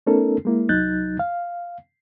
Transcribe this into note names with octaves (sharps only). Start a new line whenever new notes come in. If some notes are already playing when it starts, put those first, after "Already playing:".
A3 B3 C#4 D#4 A4 A#4
G#3 A#3 E4
C2 F#3 D#4 F#6 G6 A6
F5